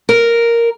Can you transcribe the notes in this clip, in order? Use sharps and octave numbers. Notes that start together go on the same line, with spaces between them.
A#4